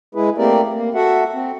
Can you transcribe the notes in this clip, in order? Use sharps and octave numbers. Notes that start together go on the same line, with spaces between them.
G#3 E4 G#4 B4
A3 A#3 C4 G4 A#4 D5
A#3
F#4 A4 E5 F#5
C4